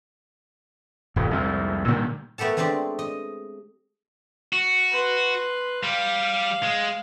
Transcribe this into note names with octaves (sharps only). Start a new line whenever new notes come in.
D#1 G2
C2 F2 G#2
A#2 D3 D#3 G3
A3 B3 G4 A4 A5
G#3 A3 C4 D4 G4 D5
D#5
F#4
B4 C6
G3 F5
G#3